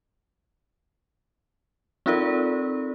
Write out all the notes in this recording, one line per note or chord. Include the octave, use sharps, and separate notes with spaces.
C4 D#4 F4 A4 A#4 D5